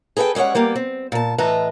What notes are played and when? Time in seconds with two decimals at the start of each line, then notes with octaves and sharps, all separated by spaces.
0.17 G#4 A4 B4 D#5 G5
0.35 G3 G#3 C#4 C#5 F#5
0.55 G3 A#3 B3 G4
0.76 C4
1.12 A#2 A5
1.38 A2 E3 B4 D#5 A5 A#5